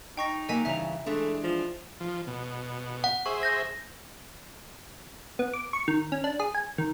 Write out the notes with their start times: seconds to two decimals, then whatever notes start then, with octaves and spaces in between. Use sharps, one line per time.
0.17 D#4 G5 C#6 A#6
0.49 F#3 A#3 D#5 G#5 B6
0.65 G2 C#3 E3 E5 A#5
1.06 E3 G#3 A3 D4
1.44 F3
2.01 F3
2.27 B2
3.04 F#5
3.26 G#4 C5 E5 C#6
3.43 G6 A#6
5.39 B3
5.53 D6
5.73 C#6
5.88 D#3
6.12 C#4
6.24 D4
6.40 G#4
6.55 G#5
6.78 D#3